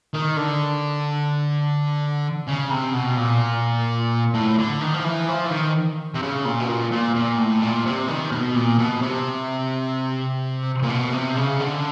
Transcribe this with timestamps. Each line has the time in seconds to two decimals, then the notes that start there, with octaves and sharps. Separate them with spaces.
0.14 D#3
0.37 D3
2.47 C#3
2.70 C3
2.94 B2
3.17 A#2
4.34 A2
4.58 D3
4.81 D#3
4.94 F3
5.05 E3
5.28 F3
5.46 E3
5.51 D#3
6.14 C3
6.22 C#3
6.45 A#2
6.60 B2
6.68 A#2
6.92 A#2
7.15 A#2
7.38 A2
7.62 A#2
7.86 C3
8.08 D#3
8.31 B2
8.55 A#2
8.79 B2
9.02 C3
10.83 A#2
10.89 B2
11.13 C3
11.37 C#3
11.60 D3